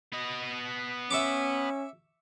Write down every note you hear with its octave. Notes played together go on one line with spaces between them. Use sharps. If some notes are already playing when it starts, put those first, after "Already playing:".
B3 D#5
C#4 E5 C#6 D6